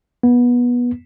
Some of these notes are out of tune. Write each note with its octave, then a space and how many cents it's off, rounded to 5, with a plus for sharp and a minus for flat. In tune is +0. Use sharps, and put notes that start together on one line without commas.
B3 -20